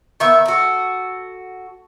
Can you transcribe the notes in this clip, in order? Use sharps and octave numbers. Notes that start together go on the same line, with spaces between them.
D#3 B3 E5
F#4 A4